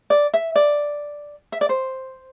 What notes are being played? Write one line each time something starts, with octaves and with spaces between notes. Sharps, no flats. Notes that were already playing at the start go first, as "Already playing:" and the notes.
D5
E5
D5
E5
D5
C5